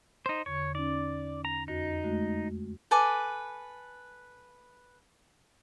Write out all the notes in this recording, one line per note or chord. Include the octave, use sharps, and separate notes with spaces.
D#4 C5
E2 D3 C#5
C#4 D#4 D5
A#5
F2 D#4 F#4
G#3 A3 F#4
A4 B4 G#5 D6